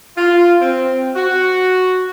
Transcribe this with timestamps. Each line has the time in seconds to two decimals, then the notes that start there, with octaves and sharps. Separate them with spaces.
0.17 F4
0.62 C4
1.16 F#4